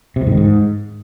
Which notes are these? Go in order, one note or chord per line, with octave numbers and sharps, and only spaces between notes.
C3
F2
G#2
D#3
G#2